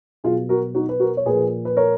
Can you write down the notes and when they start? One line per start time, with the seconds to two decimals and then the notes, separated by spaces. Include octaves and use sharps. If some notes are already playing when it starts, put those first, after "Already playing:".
0.24 B2 F#3 F4 G#4
0.49 F#4 A#4
0.75 D#4 F#4
0.89 B4
1.00 F#4 A#4
1.17 C#5
1.26 A#2 F3 G#4 B4
1.65 B4
1.77 A#4 C#5